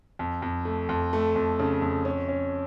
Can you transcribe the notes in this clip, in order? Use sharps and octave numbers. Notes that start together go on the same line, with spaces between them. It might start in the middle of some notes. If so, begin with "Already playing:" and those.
F2
F2
A3
F2
A3
F2
C#3
F2
C#4
C#4